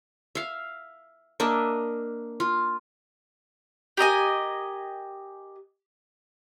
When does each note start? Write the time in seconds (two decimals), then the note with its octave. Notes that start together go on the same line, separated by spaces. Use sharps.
0.35 E5 F5
1.40 A#3 D4 D#5 E5
2.40 F4
3.97 G4 A#4 D#5 G#5